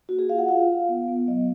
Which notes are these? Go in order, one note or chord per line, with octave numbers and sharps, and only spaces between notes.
A#3 F#4
G#4
F4 F5
F#5
F4 F5
F4
B3
B3
F#3 D#5